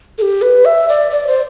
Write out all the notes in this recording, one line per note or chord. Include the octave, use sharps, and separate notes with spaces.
A4
G4
B4
E5
D5
D5
C5